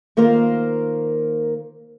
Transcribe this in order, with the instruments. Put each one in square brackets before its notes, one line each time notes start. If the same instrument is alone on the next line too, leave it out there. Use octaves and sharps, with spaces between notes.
[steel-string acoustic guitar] D#3 A#3 F4 A#4 C5